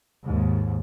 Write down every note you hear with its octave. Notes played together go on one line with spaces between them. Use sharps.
D#2 G#2